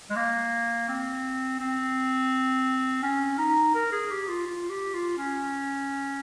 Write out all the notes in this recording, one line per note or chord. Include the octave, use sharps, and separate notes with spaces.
G#3
A#3
C4
C4
C#4
D#4
A#4
G#4
G4
F4
F4
G4
F4
C#4